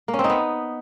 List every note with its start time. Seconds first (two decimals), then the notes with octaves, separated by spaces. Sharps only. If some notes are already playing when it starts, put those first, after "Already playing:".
0.08 A#3
0.14 C#4
0.19 C4
0.24 D#4
0.29 B3